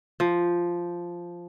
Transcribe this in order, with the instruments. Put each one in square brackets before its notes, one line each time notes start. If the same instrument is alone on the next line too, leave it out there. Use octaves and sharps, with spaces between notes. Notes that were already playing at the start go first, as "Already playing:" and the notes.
[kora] F3